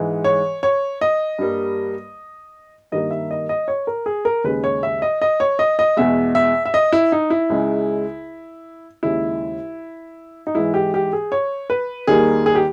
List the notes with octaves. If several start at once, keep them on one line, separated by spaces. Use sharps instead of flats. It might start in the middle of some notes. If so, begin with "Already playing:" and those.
Already playing: G#2 E3 G#3
C#5
C#5
D#5
G2 G3 A#3
G2 D#3 G3 A#3 D#5
E5
D#5
D#5
C#5
A#4
G#4
A#4
D#2 C#3 G#3 B4
C#5
E5
D#5
D#5
C#5
D#5
D#5
E2 B2 G#3 E5
E5
E5
D#5
E4
D#4
E4
C#2 C#3 G#3
D#2 C#3 G#3 E4
D#4
G#2 E3 G#3 E4
G4
G4
G#4
C#5
B4
D#2 D#3 G3 A#3 G#4
G#4
G4